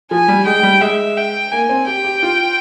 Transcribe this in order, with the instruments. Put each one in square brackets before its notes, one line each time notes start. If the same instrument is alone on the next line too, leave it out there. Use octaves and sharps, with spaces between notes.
[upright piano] F3 [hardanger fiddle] G#5
[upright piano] G3
[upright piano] G#3 [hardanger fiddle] G5
[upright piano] G3
[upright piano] G#3 [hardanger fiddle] E5
[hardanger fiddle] G5
[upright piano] A#3 [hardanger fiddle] G#5
[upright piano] C4
[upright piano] G4 [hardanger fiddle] G5
[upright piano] G4
F4